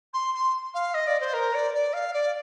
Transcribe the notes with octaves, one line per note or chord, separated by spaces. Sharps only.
C6
C6
F5
D#5
D5
C5
A#4
D5
D5
F5
D5